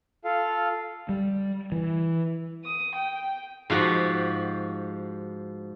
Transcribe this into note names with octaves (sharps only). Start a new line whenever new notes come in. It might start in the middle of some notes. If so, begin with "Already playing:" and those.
F4 A4 F5
G3
E3
D#6
G5
G#2 F3 F#4 G4 F#5